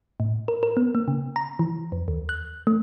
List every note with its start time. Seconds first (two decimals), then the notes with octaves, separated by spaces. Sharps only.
0.20 A2
0.48 A#4
0.63 A#4
0.77 B3
0.95 A#3
1.08 C#3
1.36 A#5
1.59 E3
1.92 F2
2.08 D#2
2.29 F#6
2.67 A3